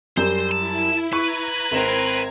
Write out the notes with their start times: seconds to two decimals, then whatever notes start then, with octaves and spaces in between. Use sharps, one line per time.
0.17 F#2 G3 C5
0.52 E4 A5
1.13 B4 A#5 C#6 G#6
1.72 G#1 C4 A#4 E7